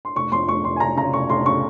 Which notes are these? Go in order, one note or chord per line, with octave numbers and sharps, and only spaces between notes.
C6
F1 C#6
F2 C6
F1 C#6
F1 C6
G#5
F1 A#5
C#3 A#5
F1 C#6
F1 C6
C#3 C#6